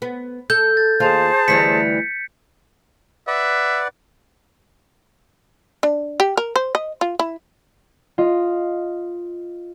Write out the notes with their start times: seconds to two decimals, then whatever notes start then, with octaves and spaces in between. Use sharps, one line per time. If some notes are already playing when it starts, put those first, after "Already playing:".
0.02 B3
0.50 A4 G6
0.77 A6
1.00 D#2 F4 G#4 C5 F5 A5
1.48 D2 E3 G3 B6 C#7
3.27 B4 D5 E5 F#5
5.83 D4
6.20 G4
6.37 A#4
6.56 C5
6.75 D#5
7.01 F4
7.19 E4
8.18 F4 D#5